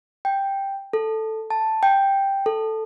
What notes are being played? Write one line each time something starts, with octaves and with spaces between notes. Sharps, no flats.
G5
A4
A5
G5
A4